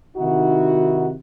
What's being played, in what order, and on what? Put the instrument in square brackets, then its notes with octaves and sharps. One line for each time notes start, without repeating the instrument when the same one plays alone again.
[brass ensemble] C3 D#3 D#4 E4 F#4